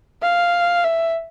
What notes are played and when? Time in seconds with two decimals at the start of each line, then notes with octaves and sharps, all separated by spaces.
0.22 F5
0.84 E5